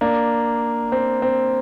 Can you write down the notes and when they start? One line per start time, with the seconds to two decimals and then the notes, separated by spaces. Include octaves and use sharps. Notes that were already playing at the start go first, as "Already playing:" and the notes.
0.01 A#3 D4
0.92 C4
1.22 C4